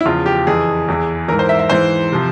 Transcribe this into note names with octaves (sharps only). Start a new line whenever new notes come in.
E4
E2 C#3 F3 F4
G4
F2 E3 G#4
E2 E3
G#2 E3 A#4
C5
E5
E5
G#2 E3 C5
C3 F3